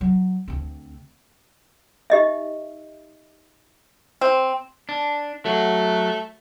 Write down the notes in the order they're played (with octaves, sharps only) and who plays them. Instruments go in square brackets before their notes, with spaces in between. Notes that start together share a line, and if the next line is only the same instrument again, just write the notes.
[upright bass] F#3
D2 C4
[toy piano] D#4 G4 D#5 E5
[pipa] C4
[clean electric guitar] D4
[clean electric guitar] F#3 [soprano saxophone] A3